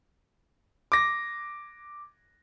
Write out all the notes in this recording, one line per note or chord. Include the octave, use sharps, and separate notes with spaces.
D6 A#6